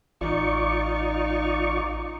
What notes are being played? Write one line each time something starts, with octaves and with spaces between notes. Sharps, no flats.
A1 D#4 F4 D5 C#6